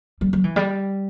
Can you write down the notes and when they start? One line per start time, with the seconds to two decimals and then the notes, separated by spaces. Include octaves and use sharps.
0.21 G3
0.33 F#3
0.44 E3
0.56 G3